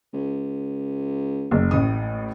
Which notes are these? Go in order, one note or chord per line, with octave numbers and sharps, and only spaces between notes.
C#2
F#1
A1 A2 D#6